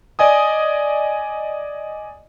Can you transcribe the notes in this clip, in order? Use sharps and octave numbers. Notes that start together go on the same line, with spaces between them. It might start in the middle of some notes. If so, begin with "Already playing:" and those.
D5 D#5 G#5 D#6